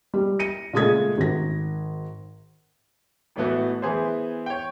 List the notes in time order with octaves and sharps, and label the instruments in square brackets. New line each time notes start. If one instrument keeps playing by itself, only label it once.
[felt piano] G3
A#6 C#7 D#7
A#2 C#3 G#3 A3 D#6 G#6
G#1 A#6
[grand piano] A1 E3 A3 B3 F#4
E3 B3 G#4 C5
C#5 G5